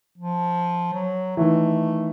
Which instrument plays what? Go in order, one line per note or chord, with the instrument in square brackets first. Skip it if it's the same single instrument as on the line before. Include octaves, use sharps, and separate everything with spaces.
[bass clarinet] F3
F#3
[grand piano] D#3 E3 [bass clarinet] A3